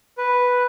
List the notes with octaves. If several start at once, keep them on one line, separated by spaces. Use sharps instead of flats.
B4